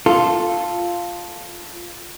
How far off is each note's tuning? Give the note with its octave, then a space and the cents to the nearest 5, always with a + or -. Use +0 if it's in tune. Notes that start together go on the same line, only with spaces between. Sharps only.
F4 +0 A4 +0